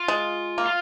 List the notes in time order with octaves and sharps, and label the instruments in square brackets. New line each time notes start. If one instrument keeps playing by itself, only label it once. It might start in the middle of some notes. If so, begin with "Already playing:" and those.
Already playing: [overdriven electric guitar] F4
[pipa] G#3
A#3
[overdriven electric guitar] F4